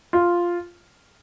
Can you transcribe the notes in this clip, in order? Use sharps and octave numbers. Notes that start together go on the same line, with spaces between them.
F4